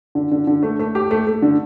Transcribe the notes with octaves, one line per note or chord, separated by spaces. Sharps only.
D3
D3
D3
A3
A3
G4
A3
A3
D3